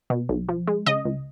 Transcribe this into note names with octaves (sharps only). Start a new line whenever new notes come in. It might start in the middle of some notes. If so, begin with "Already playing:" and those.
B2
B1
F3
G#3
C#3 D#5
C#2